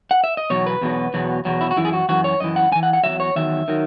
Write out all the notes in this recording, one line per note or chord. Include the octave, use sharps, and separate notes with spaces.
F#5
E5
D#5
E2 B2 F#3 C#5
B4
E2 B2 F#3
E2 B2 F#3
E2 B2 F#3
E4
F#4
F#2 E3 E4
G#4
F#4
F#2 E3 F#4
C#5
F#2 E3 D#5
F#5
F#2 E3 G#5
F#5
F#5
E2 D#3 F#3 E5
C#5
E2 D#3 F#3 E5
D#3 F#3